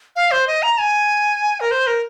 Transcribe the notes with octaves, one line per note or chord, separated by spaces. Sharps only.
F5
C5
D#5
A#5
G#5
A#4
C5
A#4